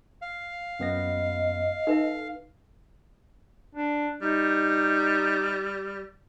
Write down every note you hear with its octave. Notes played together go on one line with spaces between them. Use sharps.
F5
F#2 B3 D#5 A#6
D#4 A4 B4 E5
D4
G3 D#4